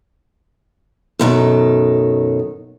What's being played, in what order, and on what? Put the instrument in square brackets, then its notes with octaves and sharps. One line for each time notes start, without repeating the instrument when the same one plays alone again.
[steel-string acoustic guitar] F#2 B2 D#3 A4